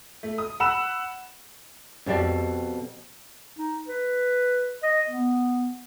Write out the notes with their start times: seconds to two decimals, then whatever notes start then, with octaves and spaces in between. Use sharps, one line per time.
0.23 A3
0.38 D#6
0.60 F#5 B5 E6 E7
2.06 F2 B2 G4 D5 E5
3.58 D#4
3.88 B4
4.83 D#5
5.09 B3